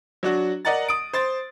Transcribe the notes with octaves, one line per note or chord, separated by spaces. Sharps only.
F#3 D4 F#4
A#4 D5 D#5 F#5 A#5 A6
D#6 D7
C5 C6 A6